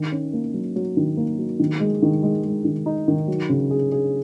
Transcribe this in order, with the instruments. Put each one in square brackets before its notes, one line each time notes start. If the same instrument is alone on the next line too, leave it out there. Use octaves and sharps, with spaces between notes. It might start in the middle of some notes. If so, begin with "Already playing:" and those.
Already playing: [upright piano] D#3
C#4
A#3
F#3
F#3
D#3
A#3
F#3
D#3
G#3
D#3
G#3
G#3
D#3
D#4
D#3
F#3
C#3
G#4
G#4